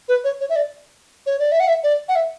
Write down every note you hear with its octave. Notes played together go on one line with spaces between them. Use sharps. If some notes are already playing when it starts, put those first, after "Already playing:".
B4
C#5
C#5
E5
D5
C#5
D5
E5
F#5
E5
D5
F#5
E5